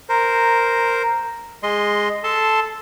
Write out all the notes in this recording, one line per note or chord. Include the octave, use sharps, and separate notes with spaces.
A#4 C5
G#3 D#5 C6
A4 A5 C6